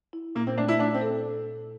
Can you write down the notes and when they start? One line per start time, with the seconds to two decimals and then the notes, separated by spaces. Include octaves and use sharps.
0.13 E4
0.35 A#2 A#3
0.47 C4
0.58 A3 D4
0.68 E4
0.80 A3 D4
0.94 C4
1.01 A4